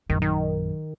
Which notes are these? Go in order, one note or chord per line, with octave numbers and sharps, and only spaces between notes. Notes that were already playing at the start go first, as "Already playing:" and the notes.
A#1 F#2 D#3
D#3